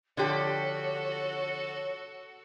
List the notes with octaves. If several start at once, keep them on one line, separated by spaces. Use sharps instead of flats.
D3 F3 F#4 G4 A4 C#5